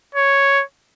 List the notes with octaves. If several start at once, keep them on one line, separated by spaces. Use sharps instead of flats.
C#5